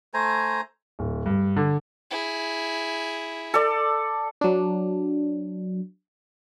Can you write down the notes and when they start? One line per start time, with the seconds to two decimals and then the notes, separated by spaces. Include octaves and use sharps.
0.14 A3 C5 G#5 A#5
0.99 D1
1.26 G2
1.56 D3
2.11 E4 G#4
3.54 A4 D5
4.41 F#3 D4